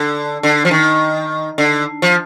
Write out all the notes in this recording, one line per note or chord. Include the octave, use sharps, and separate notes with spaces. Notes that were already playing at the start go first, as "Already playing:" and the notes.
Already playing: D3
D3
F3
D#3
D3
F3